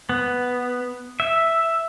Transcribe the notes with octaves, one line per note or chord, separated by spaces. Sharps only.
B3
E5